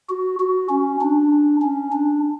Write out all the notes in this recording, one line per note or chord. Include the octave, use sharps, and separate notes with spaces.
F#4
F#4
C#4
D4
C#4
D4